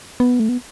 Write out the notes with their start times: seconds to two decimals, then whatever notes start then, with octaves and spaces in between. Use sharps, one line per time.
0.20 B3
0.40 A3
0.49 B3